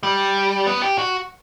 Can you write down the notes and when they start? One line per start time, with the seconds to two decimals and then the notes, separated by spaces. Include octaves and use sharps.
0.03 G3
0.67 B3
0.82 G4
0.98 F#4